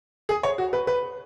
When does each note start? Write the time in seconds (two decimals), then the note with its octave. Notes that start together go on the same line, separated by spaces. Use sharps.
0.29 G#4
0.43 C#5
0.58 F#4
0.73 B4
0.87 B4